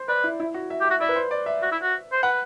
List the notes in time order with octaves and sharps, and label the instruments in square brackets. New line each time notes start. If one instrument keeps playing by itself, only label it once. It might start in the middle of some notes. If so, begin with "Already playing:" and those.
Already playing: [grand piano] C5
[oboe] B4 [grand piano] D5
[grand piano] E4
E4
F#4
E5
[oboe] G4
[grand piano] E5
[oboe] F#4
[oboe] E4 [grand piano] D5
[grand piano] B4
C5
D5
E5
[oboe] F#4
E4
F#4
C5
[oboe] B4 [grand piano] F#5